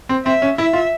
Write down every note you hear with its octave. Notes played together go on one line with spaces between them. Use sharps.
C4
C4 E5
C#4
E4 E5
F4